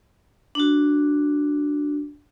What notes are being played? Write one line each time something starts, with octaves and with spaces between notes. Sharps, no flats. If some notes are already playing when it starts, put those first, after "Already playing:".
D4 F#4